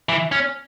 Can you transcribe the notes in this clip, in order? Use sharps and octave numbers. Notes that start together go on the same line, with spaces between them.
E3
C#4